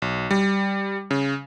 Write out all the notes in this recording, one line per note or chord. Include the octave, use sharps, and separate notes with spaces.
B1
G3
C#3